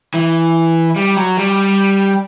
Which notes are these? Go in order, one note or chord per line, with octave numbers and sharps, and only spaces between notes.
E3
G3
F#3
G3